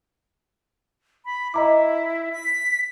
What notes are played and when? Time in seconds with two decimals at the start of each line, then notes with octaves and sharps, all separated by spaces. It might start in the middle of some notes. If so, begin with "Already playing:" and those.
1.25 B5
1.54 E4 D#5 A#5 D6
2.33 B6